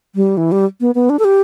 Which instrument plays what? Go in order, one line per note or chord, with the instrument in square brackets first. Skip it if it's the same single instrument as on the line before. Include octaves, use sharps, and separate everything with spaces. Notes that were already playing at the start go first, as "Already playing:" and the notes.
[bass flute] G3
E3
G3
B3
B3
D4
A4
G4